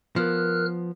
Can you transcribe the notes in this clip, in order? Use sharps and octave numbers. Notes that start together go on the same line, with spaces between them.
F3 B3 A#4 F6 F#6